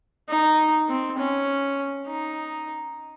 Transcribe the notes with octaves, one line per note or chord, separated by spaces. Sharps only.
D#4
C4
C#4
D#4